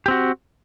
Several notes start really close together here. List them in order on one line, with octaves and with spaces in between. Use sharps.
G4 C4 F#4